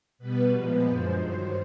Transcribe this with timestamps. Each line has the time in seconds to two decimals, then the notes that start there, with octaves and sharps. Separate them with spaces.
0.19 B2 G3 B3 B4
0.52 A#2 F3 G#3 B3
0.87 F#2 D3 F3 G#3 C5
1.20 G2 D#3 F#3 C5